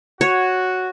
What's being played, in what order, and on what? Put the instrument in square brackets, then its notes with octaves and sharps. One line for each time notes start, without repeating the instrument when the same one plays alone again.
[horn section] F#4 [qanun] C#5